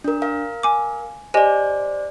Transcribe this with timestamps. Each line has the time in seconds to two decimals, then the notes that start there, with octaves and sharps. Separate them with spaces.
0.04 D4 A#4
0.22 A#4 F5
0.63 G#5 D6
1.34 G4 C5 D5 D#5 G#5